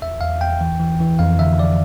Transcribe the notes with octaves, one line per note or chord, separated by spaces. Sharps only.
E2 E5
E2 F5
E2 G5
E3
E3
E3
F2 F5
D3 E5
F3 D5